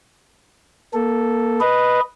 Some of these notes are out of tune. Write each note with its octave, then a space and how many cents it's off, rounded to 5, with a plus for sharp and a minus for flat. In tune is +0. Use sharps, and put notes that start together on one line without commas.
A#3 +20 A4 +0
B4 +0 D#5 +0